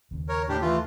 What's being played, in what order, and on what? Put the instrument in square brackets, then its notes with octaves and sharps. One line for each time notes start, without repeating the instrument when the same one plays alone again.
[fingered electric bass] D#2 C#3
[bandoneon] A#4 C#5
A2 D4 G4
E3 A3 F4